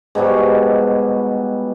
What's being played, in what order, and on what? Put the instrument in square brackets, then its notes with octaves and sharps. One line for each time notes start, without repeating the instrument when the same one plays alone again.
[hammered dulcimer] G#2 B2 F#3 G3